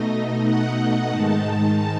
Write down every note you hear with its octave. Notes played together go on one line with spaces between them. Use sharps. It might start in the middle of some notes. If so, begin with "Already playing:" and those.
Already playing: B2 A3 D#4 D#5
F#5
G#2 D#3 G#3 D#4 A5